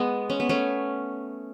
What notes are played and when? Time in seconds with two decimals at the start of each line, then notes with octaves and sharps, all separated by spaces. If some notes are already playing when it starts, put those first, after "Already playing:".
Already playing: G#3 B3
0.30 C#4
0.40 B3
0.49 A3 C#4